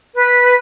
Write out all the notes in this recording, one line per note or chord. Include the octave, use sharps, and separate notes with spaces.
B4